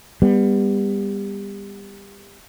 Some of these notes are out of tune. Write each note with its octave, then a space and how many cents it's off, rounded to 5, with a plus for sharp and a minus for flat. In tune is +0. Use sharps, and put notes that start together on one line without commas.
G3 +30 B3 +0